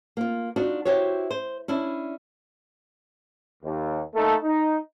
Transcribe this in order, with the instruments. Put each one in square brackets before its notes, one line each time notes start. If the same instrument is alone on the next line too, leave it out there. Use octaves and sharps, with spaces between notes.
[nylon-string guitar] A#3 F4
D4 D#4 F4 F#4
E4 F#4 G4 C5 C#5
C5
C#4 D4 E4
[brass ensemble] D#2
A3 A#3 D#4 A4
D#4